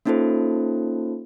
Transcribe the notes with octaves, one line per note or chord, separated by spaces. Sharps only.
A#3 C#4 D#4 F4 A4 C5